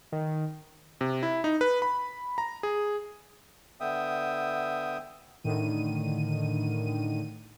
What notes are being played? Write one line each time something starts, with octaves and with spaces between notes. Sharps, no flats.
D#3
C3
E4
D#4
B4
B5
A#5
G#4
D3 B3 E5 G5 D#6
A2 D3 D#3 D#7